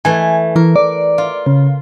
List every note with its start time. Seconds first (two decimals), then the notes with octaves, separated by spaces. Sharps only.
0.05 E3 A3 G#5
0.56 E3 A#4
0.76 D5
1.18 F4
1.46 C#3